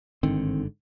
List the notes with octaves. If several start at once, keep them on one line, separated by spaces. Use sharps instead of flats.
G1 G#2 D3 D#3 C4